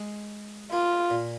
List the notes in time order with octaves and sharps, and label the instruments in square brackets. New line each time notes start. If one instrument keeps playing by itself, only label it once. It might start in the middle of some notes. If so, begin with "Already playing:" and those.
Already playing: [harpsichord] G#3
[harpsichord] A#3 [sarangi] F4
[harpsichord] A#2